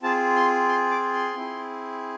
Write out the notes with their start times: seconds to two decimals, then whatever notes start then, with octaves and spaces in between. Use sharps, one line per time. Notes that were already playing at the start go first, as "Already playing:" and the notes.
0.03 C4 F4 G#4 A5
0.36 C6
0.69 C6
0.91 D6
1.13 C6
1.35 C4 E4 G#4